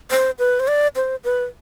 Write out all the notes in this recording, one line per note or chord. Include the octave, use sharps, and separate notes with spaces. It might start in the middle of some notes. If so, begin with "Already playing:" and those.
C5
B4
C5
D5
C5
B4